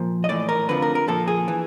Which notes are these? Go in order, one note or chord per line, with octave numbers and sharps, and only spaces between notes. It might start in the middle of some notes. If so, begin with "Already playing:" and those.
Already playing: A#2 F3
D#5
A2 E3 D5
A#4
F2 D3 F3 B4
A#4
A#4
A#2 F3 A4
G#4
E3